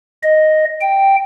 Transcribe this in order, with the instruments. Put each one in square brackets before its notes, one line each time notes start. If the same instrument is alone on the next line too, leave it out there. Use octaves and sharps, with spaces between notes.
[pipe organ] D#5
G5